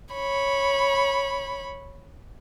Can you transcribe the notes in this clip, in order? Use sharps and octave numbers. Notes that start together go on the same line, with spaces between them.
C#5 B5